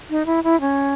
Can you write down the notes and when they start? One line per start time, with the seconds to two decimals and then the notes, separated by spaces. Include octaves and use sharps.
0.10 D#4
0.26 E4
0.44 E4
0.61 C#4